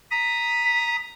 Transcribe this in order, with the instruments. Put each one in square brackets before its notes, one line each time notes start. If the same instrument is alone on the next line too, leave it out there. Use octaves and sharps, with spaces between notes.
[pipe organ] A#5 D#6 [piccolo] B6